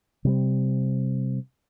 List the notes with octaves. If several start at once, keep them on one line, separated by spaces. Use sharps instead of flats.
C3 G3 C4